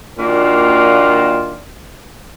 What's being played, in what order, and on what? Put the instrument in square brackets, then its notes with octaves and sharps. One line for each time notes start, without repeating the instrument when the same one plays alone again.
[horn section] A#2 D#3 A#3 D4 F4 F#4